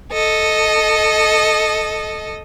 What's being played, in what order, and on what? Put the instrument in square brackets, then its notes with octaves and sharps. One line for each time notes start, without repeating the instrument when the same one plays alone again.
[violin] A4 D#5